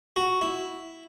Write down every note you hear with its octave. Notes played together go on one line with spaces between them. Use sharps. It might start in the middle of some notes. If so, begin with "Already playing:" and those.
F#4
E4